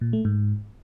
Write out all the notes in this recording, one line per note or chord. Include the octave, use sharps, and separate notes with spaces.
A#2
A3
G#2